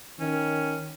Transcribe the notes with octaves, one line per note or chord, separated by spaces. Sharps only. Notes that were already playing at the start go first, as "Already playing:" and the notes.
D#3 C#4